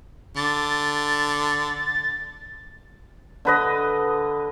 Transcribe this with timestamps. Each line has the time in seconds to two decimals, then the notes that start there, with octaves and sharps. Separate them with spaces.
0.37 D3 A6
3.45 D3 B4 D#5